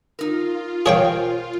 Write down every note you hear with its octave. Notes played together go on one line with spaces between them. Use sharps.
D#4 F4 A#4
G#4 A#4 C5 C#5 F5 G5